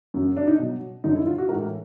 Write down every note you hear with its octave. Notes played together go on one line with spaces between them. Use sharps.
F#2 C#3 F#3
D4
D#4
B2 F#3
F#2 D3 F#3 D#4
E4
F4
F#4
A2 E3 G#3 A#4